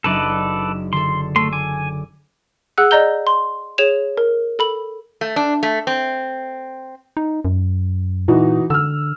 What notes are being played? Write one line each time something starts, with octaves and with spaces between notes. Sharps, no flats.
F#1 D4 D#4 A4 B4 D5
D3 A4 C6
A3 C6 E6
G#5 D6
G#4 F#5 E6 F#6
D5 D#5 A#5 G6 G7
C6
G#4 C#5 E7 F7
A#4
A4 B5 F#7
A3
D4
A3
C4
D#4
F#2
A#2 E3 D#4 F#4
D3 E6 F6